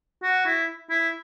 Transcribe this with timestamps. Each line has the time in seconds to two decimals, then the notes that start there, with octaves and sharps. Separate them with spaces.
0.23 F#4
0.46 E4
0.90 E4